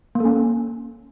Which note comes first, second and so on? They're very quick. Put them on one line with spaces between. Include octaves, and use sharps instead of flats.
A#3 A4 C#4